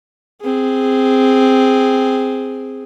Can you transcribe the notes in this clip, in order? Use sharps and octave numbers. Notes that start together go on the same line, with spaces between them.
C4 G#4